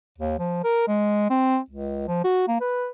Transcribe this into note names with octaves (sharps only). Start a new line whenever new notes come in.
D#2
F3
A#4
G#3
C4
C#2
F3
F#4
A#3
B4